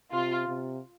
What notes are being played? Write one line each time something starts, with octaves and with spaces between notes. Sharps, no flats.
C3 F4
C3